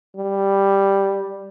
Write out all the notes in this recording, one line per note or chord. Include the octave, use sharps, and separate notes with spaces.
G3